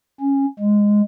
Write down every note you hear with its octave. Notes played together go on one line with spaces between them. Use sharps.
C#4
G#3